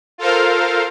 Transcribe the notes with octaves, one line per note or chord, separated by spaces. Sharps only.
F4 A4 A#4 C5 F5